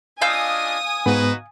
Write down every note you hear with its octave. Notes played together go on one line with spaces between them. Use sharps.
D4 F4 D#5 F5 G#5 D#6 E6 G6
G#2 B3 D#4 F#4 B4